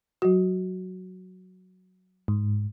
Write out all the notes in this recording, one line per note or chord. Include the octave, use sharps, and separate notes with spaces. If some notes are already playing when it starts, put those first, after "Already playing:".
F#3 F#4
G#2